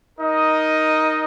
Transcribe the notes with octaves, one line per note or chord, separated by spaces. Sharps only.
D#4 A#4 D#5